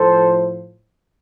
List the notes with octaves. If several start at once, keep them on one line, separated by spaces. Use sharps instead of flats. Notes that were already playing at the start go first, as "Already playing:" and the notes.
Already playing: A2 F3 A4 C5